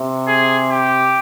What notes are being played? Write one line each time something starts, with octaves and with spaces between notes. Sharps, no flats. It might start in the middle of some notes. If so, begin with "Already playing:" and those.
Already playing: C3
G#4
G4